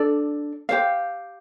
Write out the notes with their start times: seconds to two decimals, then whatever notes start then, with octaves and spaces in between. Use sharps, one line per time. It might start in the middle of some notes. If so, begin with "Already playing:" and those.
Already playing: D4 A4 D5
0.69 G4 C5 F5